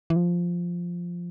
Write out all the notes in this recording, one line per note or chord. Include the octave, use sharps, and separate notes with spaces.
E3
F3